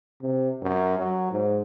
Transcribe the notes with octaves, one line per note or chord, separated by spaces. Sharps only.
C3
F#2
F#3
G#2